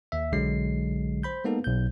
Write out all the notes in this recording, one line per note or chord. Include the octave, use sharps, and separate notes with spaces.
D#2 E5
B1 D3 F#3 G#3 C7
C5 B5 G6
G#3 A#3 B3 D#4 A4
B1 G6